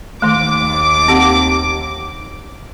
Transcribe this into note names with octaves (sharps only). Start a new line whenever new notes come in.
D#2 D#3 A3 D6
C4 G4 F#5